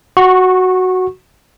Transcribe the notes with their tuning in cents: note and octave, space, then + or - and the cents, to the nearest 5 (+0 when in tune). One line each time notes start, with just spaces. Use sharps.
F#4 +0 C#6 -20